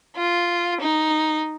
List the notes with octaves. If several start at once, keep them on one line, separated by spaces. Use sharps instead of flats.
F4
D#4